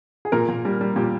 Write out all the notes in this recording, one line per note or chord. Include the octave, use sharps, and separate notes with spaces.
G#4
A#2 A#4
A#2
G3
G3
A#2 G4